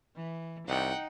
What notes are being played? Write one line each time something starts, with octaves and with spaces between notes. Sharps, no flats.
E3
C2 D#4 F#5 G5